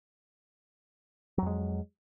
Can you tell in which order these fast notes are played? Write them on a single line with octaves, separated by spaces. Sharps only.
F#3 F2 G#3